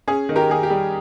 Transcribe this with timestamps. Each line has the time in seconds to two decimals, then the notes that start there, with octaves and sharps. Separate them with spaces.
0.07 C#4 G#4
0.29 D#3
0.36 G4 A#4
0.50 D#3 G#4
0.63 G4
0.70 G3